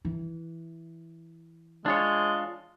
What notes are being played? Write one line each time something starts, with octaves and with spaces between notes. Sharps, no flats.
E3
G#3 D4 F4 C#5